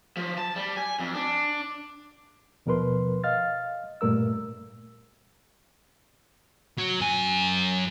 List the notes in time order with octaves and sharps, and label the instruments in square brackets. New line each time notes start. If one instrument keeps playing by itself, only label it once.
[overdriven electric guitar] F3
A5
G3
G#5
F2
D4
[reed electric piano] D#2 B2 F3 A#4 B4 C6
D#5 F5 F6 A6
G2 A#2 A3 A#4 E6
[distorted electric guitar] F#3
F#2 G#5